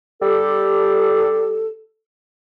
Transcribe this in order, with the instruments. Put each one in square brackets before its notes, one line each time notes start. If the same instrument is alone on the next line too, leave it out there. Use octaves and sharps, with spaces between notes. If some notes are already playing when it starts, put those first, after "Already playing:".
[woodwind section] G3 G4 A4